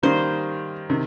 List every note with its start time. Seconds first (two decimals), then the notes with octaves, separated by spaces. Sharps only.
0.03 D#3 G3 A#3 C5
0.89 C3 D#3